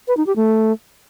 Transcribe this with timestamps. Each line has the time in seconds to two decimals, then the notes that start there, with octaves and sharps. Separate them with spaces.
0.08 B4
0.17 D#4
0.26 G4
0.36 A3